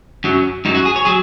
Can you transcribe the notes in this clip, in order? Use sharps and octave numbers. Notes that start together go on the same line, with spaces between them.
F#2 F#3
F#2 F#3 D#4
F#4
G#4
C#5
F#3 G#4